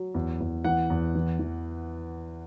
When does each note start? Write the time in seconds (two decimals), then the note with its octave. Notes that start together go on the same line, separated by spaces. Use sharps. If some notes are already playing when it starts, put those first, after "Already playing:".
Already playing: F#3
0.14 E2
0.40 E2
0.64 E3 F#5
0.90 E2
1.15 E3
1.39 E3